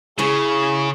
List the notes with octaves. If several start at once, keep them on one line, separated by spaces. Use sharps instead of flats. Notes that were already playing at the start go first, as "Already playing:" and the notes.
C#3 C#4 E4 G#4 C#6